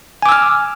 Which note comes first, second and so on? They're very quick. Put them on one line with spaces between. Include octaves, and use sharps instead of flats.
G#5 D6 E6 F6